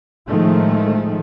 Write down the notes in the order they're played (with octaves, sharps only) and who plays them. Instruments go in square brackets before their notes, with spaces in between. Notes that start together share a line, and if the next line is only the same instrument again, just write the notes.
[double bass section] A2 D#3 F3 G#3 A3